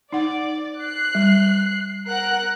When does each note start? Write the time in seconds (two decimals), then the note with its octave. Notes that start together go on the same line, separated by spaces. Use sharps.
0.12 D#4 D5 F#5
0.82 F#6 C7
1.15 G3
2.08 A#4 F#5 F#6